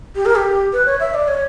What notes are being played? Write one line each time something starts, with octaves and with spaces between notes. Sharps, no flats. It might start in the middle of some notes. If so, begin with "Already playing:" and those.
G4
A#4
G4
B4
C#5
E5
D5
C#5